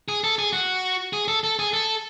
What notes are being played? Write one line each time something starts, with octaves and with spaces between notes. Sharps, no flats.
G#4
A4
G#4
F#4
G#4
A4
A4
G#4
A4